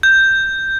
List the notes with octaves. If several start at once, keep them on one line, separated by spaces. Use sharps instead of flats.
G6